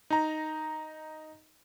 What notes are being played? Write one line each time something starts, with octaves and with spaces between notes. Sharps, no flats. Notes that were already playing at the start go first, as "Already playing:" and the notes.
D#4 A#5